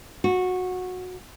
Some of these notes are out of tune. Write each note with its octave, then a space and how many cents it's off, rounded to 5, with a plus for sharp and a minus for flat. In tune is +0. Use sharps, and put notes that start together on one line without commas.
F#4 -15